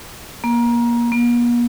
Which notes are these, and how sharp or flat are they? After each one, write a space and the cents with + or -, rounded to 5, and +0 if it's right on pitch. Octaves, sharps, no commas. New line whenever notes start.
A#3 +25
A#3 +45